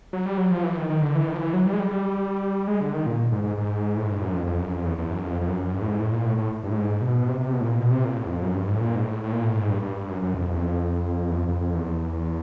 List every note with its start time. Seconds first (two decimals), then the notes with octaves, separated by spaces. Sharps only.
0.13 F#3
0.26 G3
0.38 F#3
0.51 F3
0.64 E3
0.77 D#3
0.90 D#3
1.02 D3
1.15 E3
1.28 D#3
1.34 F3
1.41 E3
1.53 F#3
1.66 G3
1.73 G#3
1.80 G3
1.91 G3
2.68 G#3
2.80 D3
2.93 D#3
3.06 A#2
3.32 G#2
3.44 G#2
3.57 G#2
3.97 A2
4.04 G#2
4.12 G2
4.22 F#2
4.34 F2
4.47 F2
4.60 F#2
4.73 F2
4.85 E2
4.98 E2
5.10 F#2
5.24 F2
5.41 F2
5.48 F#2
5.74 G2
5.82 A2
5.87 G#2
6.00 A2
6.12 A#2
6.26 A2
6.38 A2
6.63 G2
6.71 A2
6.76 G#2
7.01 B2
7.28 C3
7.40 C3
7.53 B2
7.61 A2
7.65 A#2
7.78 B2
7.91 C3
8.05 A#2
8.16 A2
8.26 E2
8.30 F2
8.43 F#2
8.55 G2
8.68 G#2
8.75 A2
8.81 A#2
8.95 G#2
9.05 A2
9.23 A2
9.32 A#2
9.44 A2
9.57 G#2
9.70 G2
9.82 G2
10.08 F#2
10.22 F#2
10.34 F2
10.53 E2
10.60 F2
11.30 E2
11.36 F2
11.48 F2
11.61 F2
11.74 E2